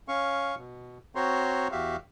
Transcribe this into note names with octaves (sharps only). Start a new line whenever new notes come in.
C#4 F5 C#6
B2
C4 F#4 C5 C#5 A#5 C6
E2 F#4 G4 E5 F5